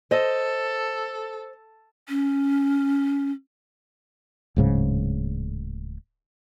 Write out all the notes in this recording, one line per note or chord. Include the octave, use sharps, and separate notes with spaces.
A4 C5 D#5
C#4
D1 G#2 C#3